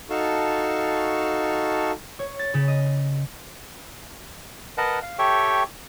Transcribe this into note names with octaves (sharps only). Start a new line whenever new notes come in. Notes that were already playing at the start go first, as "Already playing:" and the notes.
D#4 F#4 A4 F5 A5 C#6
C#5
A6
C#3
D#5
A#4 B4 D#5 F#5 A5
F5
G4 A4 C#5 E5 G5 C#6